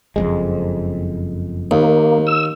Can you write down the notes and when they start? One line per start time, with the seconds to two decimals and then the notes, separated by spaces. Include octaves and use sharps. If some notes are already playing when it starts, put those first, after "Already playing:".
0.16 F#1 F2 G#3
1.71 D#2 A#3
2.27 E6